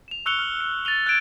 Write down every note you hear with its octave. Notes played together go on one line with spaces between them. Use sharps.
E7 F7
C#6 E6 F#6 C#7 F7 G7
F6 F#7
C#7 G7
A6 D#7 F7 G7
F#6 G#6 D7 E7